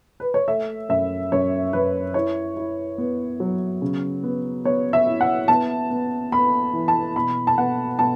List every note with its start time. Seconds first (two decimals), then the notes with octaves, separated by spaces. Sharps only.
0.20 B4
0.34 C#5
0.48 A3 E5
0.89 F#2 E5
1.32 F#2 C#5
1.73 F#2 B4
2.14 E4 C#5
2.57 E4
2.98 B3
3.40 F#3
3.82 C#3
4.23 B3
4.65 B3 C#5
4.93 E5
5.07 E4
5.21 F#5
5.48 B3 A5
5.90 B3
6.32 B3 B5
6.73 E3
6.88 A5
7.16 B2 B5
7.47 A5
7.58 B3 F#5
7.99 B2 A5